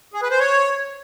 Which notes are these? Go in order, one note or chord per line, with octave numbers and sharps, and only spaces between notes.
G#4
B4
C5
C#5